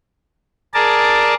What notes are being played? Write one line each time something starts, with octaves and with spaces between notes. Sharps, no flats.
G#4 A#4 D5 A5